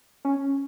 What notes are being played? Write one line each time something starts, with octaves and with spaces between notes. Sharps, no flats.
C#4